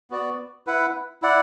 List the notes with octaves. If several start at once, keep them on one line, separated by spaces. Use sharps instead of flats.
B3 F#4 D5
E4 B4 F#5
E4 D5 F#5